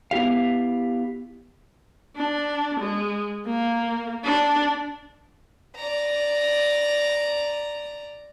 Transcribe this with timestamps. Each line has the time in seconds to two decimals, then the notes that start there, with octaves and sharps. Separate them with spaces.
0.11 B3 E4 G4 F5
2.16 D4
2.80 G#3
3.46 A#3
4.24 D4
5.76 D5 A#5